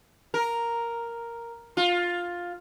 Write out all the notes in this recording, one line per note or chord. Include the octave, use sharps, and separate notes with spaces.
A#4
F4